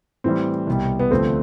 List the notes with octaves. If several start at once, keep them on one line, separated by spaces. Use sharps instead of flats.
A2 E3 G3 C4
C2 B2 G3
B3
D2 D3 F3 A3 C4